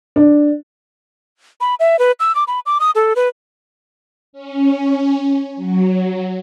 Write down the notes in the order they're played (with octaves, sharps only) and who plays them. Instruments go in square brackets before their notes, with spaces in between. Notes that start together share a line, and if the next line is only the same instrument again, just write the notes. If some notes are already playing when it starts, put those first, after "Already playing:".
[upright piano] D4
[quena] B5
E5
B4
E6
D6
B5
D6
D#6
A4
B4
[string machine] C#4
F#3